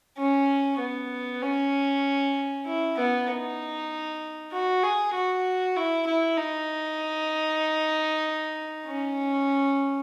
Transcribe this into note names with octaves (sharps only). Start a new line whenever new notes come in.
C#4
B3
C#4
E4
B3
D#4
F#4
G#4
F#4
E4
E4
D#4
C#4